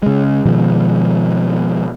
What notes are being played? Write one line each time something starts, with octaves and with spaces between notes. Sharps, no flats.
C#3 G#3
B2 D#3 F3 G#3